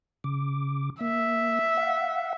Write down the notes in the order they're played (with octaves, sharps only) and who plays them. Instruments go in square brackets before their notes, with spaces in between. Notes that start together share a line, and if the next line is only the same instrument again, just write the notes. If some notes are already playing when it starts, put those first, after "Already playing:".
[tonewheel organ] C#3 D6
[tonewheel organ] A#3 [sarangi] E5
[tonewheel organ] F5 F#5